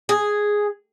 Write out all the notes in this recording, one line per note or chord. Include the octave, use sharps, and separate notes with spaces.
G#4